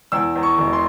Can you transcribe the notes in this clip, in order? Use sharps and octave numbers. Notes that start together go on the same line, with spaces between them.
E2 E6
E2
C#6
E1
C6